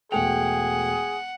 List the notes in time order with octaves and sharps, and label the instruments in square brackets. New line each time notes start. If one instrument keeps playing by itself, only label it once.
[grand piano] E1 A3 F7 [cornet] G#4 [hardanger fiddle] F#5 [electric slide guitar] G5